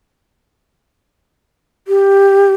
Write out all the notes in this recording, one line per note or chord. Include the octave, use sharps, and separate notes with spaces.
G4